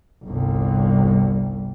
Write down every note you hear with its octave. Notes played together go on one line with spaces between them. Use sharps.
G1 C2